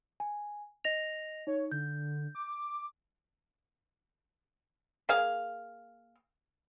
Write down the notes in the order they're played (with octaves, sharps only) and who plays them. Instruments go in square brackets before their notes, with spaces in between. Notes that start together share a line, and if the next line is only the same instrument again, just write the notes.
[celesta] G#5
D#5 A#6 F7
[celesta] D#4 [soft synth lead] C#5
[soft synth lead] D3 [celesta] G6
[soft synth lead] D6
[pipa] A#3 G#4 F5